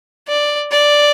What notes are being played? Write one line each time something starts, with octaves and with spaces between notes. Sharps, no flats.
D5
D5